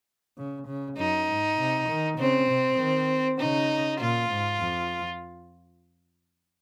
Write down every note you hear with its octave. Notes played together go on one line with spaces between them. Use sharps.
C#3
C#3
F#2 D#4
G#2
C3
D#3
C#3 C4
C3
D#3
C#3 D#4
A#2 F4
G#2
F2